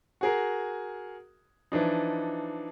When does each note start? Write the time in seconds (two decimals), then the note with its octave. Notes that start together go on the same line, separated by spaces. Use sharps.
0.21 F#4 G#4 A#4
1.72 E3 F3 D4 D#4